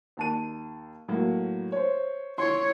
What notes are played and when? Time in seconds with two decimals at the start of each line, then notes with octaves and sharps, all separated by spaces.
0.17 D#2 A5 D#7
1.08 A2 F#3 A#3
1.72 C5 C#5
2.38 E4 C#5 C6